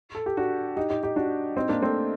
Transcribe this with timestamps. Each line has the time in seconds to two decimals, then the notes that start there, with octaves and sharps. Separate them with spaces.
0.15 A4
0.26 G4
0.37 D4 F#4
0.76 D#4 G4
0.90 D#4 G4
1.03 D#4 G4
1.16 D4 F#4
1.57 C4 D#4
1.69 A#3 D4
1.82 A3 C4